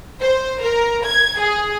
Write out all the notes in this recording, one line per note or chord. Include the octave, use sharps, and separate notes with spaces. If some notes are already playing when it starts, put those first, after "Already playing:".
C5
A#4
G#6
G#4